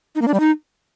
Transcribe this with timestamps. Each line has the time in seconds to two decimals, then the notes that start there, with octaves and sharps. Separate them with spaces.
0.15 D#4
0.21 A#3
0.28 D4
0.34 G3
0.40 D#4